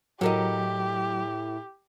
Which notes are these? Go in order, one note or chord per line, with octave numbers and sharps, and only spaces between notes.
A2 F#3 G4 A#4 D#5